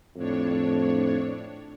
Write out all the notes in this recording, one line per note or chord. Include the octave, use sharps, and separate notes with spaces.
F2 A2 D4 C#5